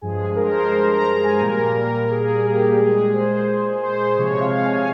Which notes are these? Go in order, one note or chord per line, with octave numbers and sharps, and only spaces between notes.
G2 F3 G#3 G#4
A#4
C5
A#4
C5
A#5
A#5
G#5
A#2 G3 A#3 A#4
A#4
G#4
G4
A#2 G#3 G#4
C5
C5
C3 F3 G#3 C#5
F5
G#5